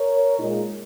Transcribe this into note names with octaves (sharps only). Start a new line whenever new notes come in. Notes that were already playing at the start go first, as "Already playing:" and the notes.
Already playing: A#4 C#5
A#2 G#3 D#4